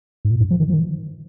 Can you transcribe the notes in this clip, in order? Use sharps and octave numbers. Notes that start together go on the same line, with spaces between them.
G#2
A#2
G2
F3
D#3
F3
D#3